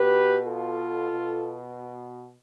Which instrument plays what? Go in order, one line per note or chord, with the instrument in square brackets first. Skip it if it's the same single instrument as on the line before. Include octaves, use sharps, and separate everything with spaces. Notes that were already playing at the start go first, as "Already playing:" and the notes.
Already playing: [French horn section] B2 G4 B4
F4 A4
B2